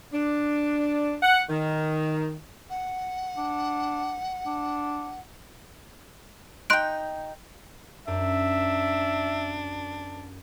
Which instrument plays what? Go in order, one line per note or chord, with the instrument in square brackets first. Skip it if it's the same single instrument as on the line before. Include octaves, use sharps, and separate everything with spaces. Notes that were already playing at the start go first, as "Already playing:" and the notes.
[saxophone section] D4
F#5
D#3
[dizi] F#5
[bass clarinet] D4
D4
[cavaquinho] D#4 G5 [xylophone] C6 F#6 D7
[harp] F#2 [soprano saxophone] D4 [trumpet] E5